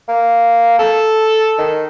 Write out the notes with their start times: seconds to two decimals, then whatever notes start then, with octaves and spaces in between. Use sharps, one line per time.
0.08 A#3
0.79 A4
1.58 D#3